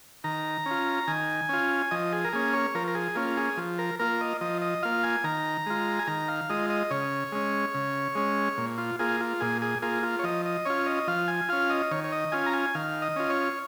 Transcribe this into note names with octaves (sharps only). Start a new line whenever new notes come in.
D#3 A#5
C#4
F4
D#3 G#5
C#4 F4
F3 D#5
G#4
A#4
A#3 C#4 G#4
C#5
F3 A#4
A#4
G#4
A#3 C#4 F4
G#4
F3
A#4
A#3 F4 A#4
D#5
F3 D#5
D#5
A#3 F4 F5
G#5
D#3 A#5
G#3 F4
G#5
D#3 A#5
F5
G#3 F4 D#5
D#5
C#3 C#5
G#3 C#4
C#3
G#3 C#4
A#2
F4
A#3 F4 G#4
F4
A#2 G#4
G#4
A#3 F4 G#4
F4
C#5
F3 D#5
D#5
C#4 F4 C#5
D#5
F3 F5
G#5
C#4 F4 F5
D#5
D#3 C#5
C#5
D#5
C#4 F4 G#5
A#5
G#5
D#3 F5
D#5
C#4 F4
C#5